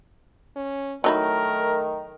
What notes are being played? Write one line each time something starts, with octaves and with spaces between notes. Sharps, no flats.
C#4
D#3 F#3 A3 D#4 E4 A#4